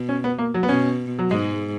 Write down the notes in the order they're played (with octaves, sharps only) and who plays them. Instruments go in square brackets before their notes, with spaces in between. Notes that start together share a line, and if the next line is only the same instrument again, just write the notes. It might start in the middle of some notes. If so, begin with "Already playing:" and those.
Already playing: [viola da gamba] B2
[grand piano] C#4
B3
A#3
F#3
B3
[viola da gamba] B2 [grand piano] C#4
[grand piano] F#3
[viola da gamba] G#2 [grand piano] G#3